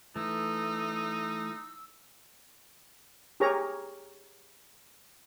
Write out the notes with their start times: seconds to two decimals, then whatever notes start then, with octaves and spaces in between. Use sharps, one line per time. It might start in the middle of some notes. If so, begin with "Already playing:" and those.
0.16 E3 A3 D#4 E6
3.40 G4 G#4 A#4 C#5 A#5